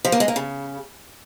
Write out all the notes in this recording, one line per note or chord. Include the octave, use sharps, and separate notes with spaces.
F3
A#3
G#3
A#3
C#3